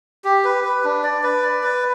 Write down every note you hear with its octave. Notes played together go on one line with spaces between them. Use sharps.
G4
B4
B4
D4
D5
B4
D5
B4